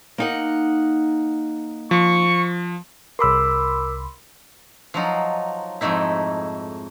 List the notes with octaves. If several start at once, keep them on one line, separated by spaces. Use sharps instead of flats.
A#3 D#4 F#5
F3 C#6
C2 A#4 B5 C6 D6 E6
F3 F#3 D#4 F4
F2 G#2 A3 D#4 E4